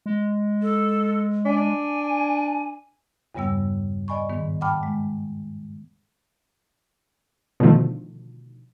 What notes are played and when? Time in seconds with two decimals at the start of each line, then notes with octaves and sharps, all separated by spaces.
0.06 G#3
0.62 A4
1.46 D4 G#5
3.35 E2 G2 C#3 G3 B3 E6
4.08 D5 D#5 G#5 B5 C#6
4.29 G#2 D#3 B3
4.61 F#5 G5 A5 B5 D6 F6
4.83 G#3
7.60 B2 D3 D#3 F3 A3